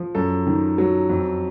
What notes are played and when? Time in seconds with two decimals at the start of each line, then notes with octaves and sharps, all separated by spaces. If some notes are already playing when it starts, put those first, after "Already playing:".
Already playing: F3
0.15 F#2 A4
0.47 D#3
0.78 F#3
1.10 F2